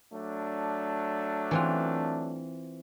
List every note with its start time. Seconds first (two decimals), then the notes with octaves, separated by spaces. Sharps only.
0.13 F#3 A3 D4
1.51 E3 C4 F4